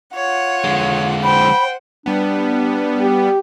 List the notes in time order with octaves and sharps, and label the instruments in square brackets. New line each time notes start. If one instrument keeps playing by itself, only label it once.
[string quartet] F4 F#5 [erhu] C#5
[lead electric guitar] D3 G#3
[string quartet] C5 F#5 [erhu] G5 [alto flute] B5
[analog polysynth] G3 B3 [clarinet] D4
[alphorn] G4